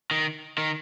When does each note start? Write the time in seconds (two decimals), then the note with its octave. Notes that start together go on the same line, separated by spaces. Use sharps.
0.11 D#3
0.58 D#3